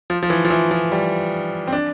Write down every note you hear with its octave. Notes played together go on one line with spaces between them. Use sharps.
F3
F3
E3
F3
E3
F3
G3
C4
D4